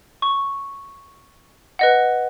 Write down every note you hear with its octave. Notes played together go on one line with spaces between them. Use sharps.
C#6
B4 D#5 F#5